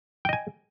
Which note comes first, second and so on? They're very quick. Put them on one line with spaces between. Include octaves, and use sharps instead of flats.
G5 D#5 G#5